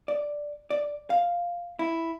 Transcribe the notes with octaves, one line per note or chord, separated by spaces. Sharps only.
D5
D5
F5
E4